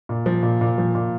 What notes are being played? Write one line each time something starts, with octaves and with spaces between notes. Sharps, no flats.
A#2
F3
A#2
A#2
F3
A#2